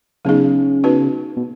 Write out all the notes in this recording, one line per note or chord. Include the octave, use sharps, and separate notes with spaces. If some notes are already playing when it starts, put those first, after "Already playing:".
C#3 F#3 B3 D#4 G#4
B3 D#4 F#4 B4
B2